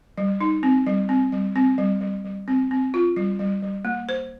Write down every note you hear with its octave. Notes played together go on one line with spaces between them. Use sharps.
G3
D#4
C4
G3
C4
G3
C4
G3
G3
G3
C4
C4
F4
G3
G3
G3
A#3
C5